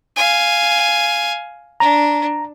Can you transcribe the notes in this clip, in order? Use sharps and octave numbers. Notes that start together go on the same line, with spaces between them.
F5 G#5
D4 A#5